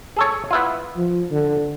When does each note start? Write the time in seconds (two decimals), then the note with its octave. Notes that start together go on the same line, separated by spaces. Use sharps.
0.17 G#4 A4 C#5
0.51 B3 E4 F4
0.97 F3
1.31 D3